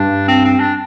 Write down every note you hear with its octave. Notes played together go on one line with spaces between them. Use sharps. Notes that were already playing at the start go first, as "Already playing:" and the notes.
Already playing: G2 D4
C4
C4
D4